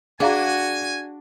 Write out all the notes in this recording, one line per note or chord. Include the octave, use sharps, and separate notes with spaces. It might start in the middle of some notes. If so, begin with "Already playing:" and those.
D4 F#4 G#4 F5 G#5 A#5